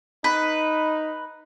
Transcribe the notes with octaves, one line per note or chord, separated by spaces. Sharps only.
D#4 B4